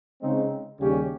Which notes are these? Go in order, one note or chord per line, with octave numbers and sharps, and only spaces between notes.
C#3 G#3 C4 D#4
D#2 C#3 G3 C#4 G4